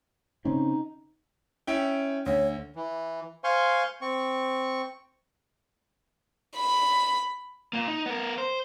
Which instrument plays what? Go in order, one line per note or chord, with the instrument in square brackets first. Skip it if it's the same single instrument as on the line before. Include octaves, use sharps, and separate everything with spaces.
[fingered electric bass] C#3 C4 C#4 [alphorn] D#4
[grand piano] C#4 E4 G5
[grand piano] D2 [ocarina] C#5
[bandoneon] E3
C5 F5 G#5 C6 C#6
C4 C#6
[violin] B5
[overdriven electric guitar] A#2 A#3
D#4
B3 A#4
C5